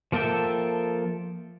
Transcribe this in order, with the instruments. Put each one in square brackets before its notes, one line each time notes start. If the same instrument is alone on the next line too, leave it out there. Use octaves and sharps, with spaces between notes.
[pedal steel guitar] F3 A#3 A4 E5 G5